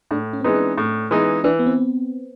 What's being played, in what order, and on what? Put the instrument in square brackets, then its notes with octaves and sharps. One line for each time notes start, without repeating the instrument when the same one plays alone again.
[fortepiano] A2 [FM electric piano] D4
[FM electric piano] C#4
C4
[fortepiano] E3 G#3 B3 D#4 [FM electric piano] C#4
[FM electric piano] D4
[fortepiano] A2
E3 G#3 B3 D#4
[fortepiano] E3 [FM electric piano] D4
[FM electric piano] B3
C4